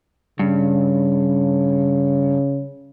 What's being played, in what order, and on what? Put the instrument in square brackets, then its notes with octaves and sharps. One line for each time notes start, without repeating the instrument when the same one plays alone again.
[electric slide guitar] G2 [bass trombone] C#3